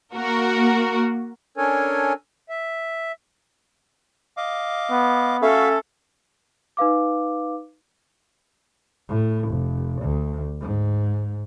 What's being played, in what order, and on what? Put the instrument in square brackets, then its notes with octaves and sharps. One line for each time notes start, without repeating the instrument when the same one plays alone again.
[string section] A#3 F#4 A#4
[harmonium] C#4 D4 A4 A#4 C#5 G#5
E5
[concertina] D#5 F5 D6
[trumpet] B3
[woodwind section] A3 C#4 A4 [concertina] F#4 E5 F5
[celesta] D#4 B4 F5 D6
[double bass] A2
F1
D2
G#2